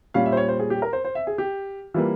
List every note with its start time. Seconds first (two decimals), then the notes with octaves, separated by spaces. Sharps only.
0.14 A#2 G3 C#4 F5
0.26 E5
0.32 C5
0.37 C#5
0.48 C5
0.59 G#4
0.70 G4
0.82 A#4
0.93 C5
1.05 C5
1.15 E5
1.27 G#4
1.38 G4
1.94 E3 G3 A#3 F4